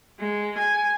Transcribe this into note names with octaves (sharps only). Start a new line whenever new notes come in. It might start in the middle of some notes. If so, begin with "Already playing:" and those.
G#3
G#5